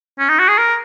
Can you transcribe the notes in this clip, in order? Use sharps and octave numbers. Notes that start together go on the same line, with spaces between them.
C#4
D#4
F#4
G#4
A#4